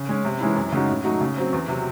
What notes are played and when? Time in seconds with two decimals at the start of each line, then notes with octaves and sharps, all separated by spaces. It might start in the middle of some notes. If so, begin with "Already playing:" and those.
Already playing: C#3
0.09 G#3 C#4
0.25 C3
0.41 E3 G#3 C#4 E4
0.56 F#2
0.72 C#3 G#3 D#4 F#4
0.89 A2
1.04 F#3 A3 D#4 F#4
1.21 C#3
1.37 F#3 C4
1.53 E2
1.68 C3 F#3